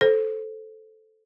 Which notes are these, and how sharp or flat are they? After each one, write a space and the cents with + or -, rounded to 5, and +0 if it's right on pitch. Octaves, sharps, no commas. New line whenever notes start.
A4 -10 C5 +0